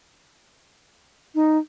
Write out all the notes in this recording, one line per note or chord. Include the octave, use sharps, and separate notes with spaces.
D#4